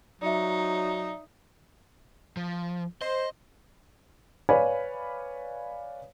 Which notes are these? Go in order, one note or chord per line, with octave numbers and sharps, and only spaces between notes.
F#3 D#4 D5 E5
F3
C5 D#5
B4 C#5 D5 F5 G#5 B5